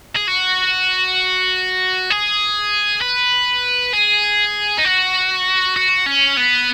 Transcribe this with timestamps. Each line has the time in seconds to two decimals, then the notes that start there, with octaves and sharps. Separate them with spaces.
0.16 G#4
0.27 F#4
2.10 G#4
3.01 B4
3.93 G#4
4.78 D#4
4.85 F#4
5.76 F#4
6.06 C#4
6.37 B3